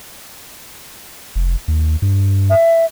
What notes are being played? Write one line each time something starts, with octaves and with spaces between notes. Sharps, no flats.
F1
D#2
G2
E5